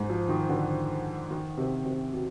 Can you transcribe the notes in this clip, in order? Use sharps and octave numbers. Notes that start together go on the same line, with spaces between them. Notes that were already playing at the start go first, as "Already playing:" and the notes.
Already playing: G#2
F3
D#3
D3
D#3
C3
C3
B2